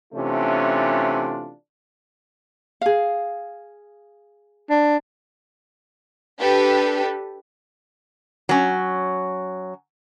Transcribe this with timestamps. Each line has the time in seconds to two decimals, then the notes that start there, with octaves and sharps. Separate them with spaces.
0.13 C3 E3 A3 C#4 D4 F4
2.81 G#4 F5
4.70 D4
6.41 D4 G4 A4 B4
8.49 F#3 C#4